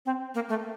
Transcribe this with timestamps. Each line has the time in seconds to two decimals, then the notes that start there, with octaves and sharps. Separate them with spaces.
0.06 C4
0.35 A#3
0.49 A3